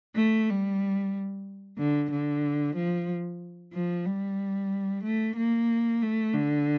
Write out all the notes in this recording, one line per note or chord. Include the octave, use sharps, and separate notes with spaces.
A3
G3
D3
D3
F3
F3
G3
A3
A#3
A3
D3